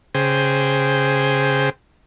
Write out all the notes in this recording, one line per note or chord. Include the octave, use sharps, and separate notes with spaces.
C#3 G#4 C5 G5